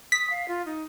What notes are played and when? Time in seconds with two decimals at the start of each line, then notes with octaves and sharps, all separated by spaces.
0.12 D#6 B6
0.30 F5
0.48 F4
0.66 D#4